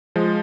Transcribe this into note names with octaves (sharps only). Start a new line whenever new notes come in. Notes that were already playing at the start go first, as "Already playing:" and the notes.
F3 G#3